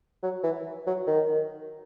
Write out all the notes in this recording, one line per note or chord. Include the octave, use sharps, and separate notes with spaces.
F#3
E3
F#3
D#3